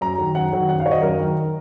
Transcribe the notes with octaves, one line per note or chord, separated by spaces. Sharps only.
F#2 A#5
D#3 F#3
F#2 F#5
D#3 F#3
F#2 F#5
F5
D#3 F#3 C#5 D#5
F#2 A#4
D#3 F#3